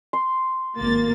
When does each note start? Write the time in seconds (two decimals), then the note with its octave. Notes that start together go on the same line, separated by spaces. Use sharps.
0.13 C6
0.79 G#1 A#3 A6